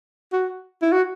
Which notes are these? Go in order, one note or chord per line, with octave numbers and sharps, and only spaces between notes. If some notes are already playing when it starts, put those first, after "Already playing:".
F#4
E4
F#4